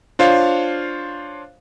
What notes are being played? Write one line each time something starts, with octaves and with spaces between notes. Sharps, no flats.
D4 F4 C5 C#5 F5